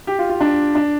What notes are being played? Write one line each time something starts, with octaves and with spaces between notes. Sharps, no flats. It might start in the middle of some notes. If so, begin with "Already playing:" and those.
G4
F4
F4
D4
D4